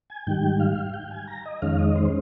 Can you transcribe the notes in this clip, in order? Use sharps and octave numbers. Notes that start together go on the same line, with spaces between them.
G#5
G#2 D#3 G3 G5
F5
G5
G#5
A#5
D#5
F2 D#3 G#3 C#4 F5
D#5
C5